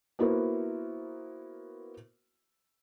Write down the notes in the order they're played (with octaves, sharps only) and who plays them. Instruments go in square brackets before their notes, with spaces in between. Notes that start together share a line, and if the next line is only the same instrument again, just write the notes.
[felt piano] A#3 B3 E4 F#4 A#4 C5